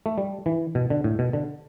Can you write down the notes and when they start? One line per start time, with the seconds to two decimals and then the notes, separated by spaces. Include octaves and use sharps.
0.06 A3
0.18 G3
0.46 E3
0.75 B2
0.90 D3
1.04 A2
1.19 B2
1.33 D3